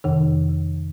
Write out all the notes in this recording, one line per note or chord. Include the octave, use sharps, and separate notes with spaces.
F2 C3 D#3